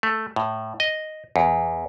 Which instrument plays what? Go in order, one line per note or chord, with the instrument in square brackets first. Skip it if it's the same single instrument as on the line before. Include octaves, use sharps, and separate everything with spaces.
[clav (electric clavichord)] A3
A2
D#5
E2